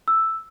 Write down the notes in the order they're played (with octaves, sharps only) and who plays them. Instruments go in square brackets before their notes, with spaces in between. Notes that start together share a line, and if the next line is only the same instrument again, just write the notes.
[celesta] E6